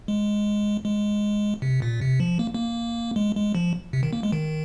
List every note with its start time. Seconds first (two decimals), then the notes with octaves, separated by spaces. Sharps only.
0.08 G#3
0.85 G#3
1.62 C3
1.82 A#2
2.01 C3
2.20 F3
2.39 A#3
2.54 A#3
3.16 G#3
3.36 G#3
3.55 F3
3.93 C3
4.03 D#3
4.13 A#3
4.23 G#3
4.32 D#3